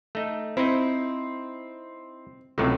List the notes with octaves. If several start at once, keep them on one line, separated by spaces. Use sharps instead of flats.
A3 D#4
C4 D#4 E4
C#2 A2 C3 F#3 F4